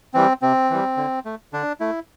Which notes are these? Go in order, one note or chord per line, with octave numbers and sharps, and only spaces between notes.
E3 G3 C4
C3 C4
E3 G3
D3
A3
D3 D4
A3 E4